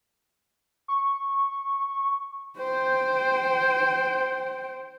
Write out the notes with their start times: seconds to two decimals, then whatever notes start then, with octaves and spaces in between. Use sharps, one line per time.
0.88 C#6
2.59 C5 G5